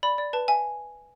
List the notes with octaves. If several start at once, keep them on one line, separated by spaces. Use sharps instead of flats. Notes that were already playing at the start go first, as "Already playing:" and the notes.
D5 B5
D5
B4 A5
E5 G#5